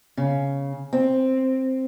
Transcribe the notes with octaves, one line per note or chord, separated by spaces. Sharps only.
C#3
C4